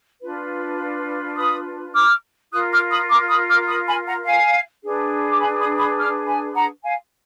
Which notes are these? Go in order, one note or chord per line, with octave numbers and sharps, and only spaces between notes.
D4 F4 B4
B5 D#6
D6 F6
F4 A#4 D#6 F#6
D6 F6
B5 D#6
A#5 D6
B5 D#6
D6 F6
B5 D#6
G#5 B5
F#5 A#5
F5 G#5
D4 G#4 B4
D6
G#5 B5
B5 D#6
B5 D#6
D6 F6
G#5 B5
F#5 A#5
F5 G#5